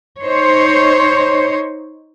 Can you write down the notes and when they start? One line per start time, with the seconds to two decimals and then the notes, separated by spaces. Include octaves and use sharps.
0.21 D#4 C5 C#5